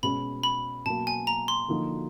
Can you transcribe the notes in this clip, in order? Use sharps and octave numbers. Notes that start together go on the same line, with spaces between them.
B2 G#3 C#4 B5
B5
B2 F#3 A#3 A5
G#5
A#5
C6
D3 F3 A#3 D#4 F#4